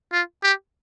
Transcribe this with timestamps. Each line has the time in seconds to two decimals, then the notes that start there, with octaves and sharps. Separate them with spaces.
0.13 F4
0.43 G4